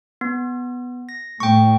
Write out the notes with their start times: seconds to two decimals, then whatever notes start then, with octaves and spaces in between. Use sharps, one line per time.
0.21 B3
1.09 A#6
1.40 A2 G5 C#6